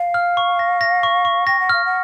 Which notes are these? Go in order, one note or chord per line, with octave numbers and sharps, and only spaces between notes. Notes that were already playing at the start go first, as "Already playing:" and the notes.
Already playing: F5
F6
C#6
A#6
A#6
C#6
C#6
G5 A#6
F#5
F5 F6
F#5